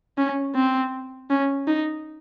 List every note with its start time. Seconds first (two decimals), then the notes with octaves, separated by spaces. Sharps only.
0.18 C#4
0.55 C4
1.30 C#4
1.67 D#4